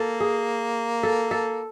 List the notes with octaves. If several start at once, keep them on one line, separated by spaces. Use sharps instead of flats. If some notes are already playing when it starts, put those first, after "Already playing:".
Already playing: A#3 A4
G#4
A4
A4